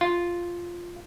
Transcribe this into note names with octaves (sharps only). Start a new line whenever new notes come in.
F4